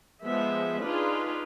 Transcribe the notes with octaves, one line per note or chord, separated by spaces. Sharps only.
F3 G#3 B3 E5
D4 D#4 F4 G#4 B4